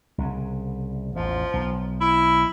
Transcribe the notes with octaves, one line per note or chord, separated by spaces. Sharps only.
C2 C#3
A1 E2 F3
B1
E4